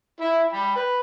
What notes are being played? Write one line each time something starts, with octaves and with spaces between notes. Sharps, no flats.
E4 E5
G5 B5
B4